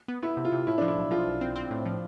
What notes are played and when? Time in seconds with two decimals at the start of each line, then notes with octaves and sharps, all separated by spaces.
0.08 B3
0.22 B3 E4
0.37 C3
0.45 F4
0.52 C3
0.67 A2 E4
0.78 F3 D4
0.88 E4
0.97 B1
1.11 F3 F4
1.26 B1
1.41 C4
1.56 C4
1.71 A2
1.86 F3